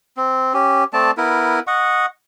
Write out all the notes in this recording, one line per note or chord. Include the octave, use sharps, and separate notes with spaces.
C4
C#4 G4
A3 C4 D5 A5
B3 E4 A#4
D#5 F#5 C#6